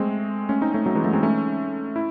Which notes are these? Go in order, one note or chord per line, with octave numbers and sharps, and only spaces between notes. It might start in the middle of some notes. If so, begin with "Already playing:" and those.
Already playing: G#3 A3 C4
A3 C#4
C4 D#4
A3 C#4
F#3 A3
E3 G#3
F#3 A3
G#3 C4
A3 C#4
E4